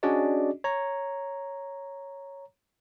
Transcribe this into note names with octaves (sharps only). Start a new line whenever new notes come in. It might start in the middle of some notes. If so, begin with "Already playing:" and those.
C#4 D4 F#4 G#4 D5 D#5
C#5 A#5